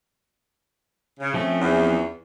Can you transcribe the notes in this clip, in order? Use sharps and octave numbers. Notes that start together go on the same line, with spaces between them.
C#3
F3 A3 C4 C#4
E2